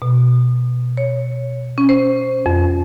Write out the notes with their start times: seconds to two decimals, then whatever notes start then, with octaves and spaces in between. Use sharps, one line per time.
0.02 B2
0.97 C#5
1.78 C#4
1.89 C5
2.46 F2